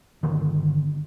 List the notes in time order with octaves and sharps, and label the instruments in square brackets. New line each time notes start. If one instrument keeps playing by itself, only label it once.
[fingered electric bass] G1 B2 D3 D#3